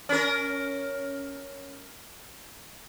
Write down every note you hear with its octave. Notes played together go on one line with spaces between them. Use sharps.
C#4 A#4